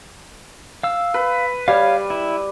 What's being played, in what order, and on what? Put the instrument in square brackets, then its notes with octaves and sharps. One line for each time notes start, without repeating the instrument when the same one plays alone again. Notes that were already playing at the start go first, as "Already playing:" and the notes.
[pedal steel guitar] F5 E6
[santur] B4
[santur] G3 [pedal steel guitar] C#5 F5
[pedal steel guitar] E4